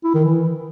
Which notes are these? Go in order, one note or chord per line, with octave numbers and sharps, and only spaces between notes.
E4
D#3
E3